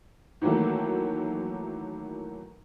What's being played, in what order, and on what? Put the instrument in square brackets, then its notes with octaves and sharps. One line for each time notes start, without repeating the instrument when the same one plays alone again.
[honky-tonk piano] D#3 E3 F#3 A3 A#3